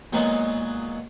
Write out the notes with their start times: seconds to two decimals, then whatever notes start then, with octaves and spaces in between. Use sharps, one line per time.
0.13 A#2 F#3 G#3 B3 D#4 F#4